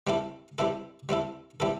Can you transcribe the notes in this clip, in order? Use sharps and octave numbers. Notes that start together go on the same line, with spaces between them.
G3 C4 E4 A4
G3 C4 E4 A4
G3 C4 E4 A4
G3 C4 E4 A4